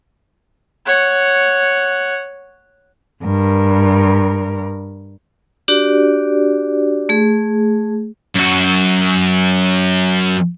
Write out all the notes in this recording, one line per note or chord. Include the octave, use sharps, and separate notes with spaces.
C#5 F#5
G2 A#4
D4 F#4 G4 D5
A3 G#4
F#2 F#4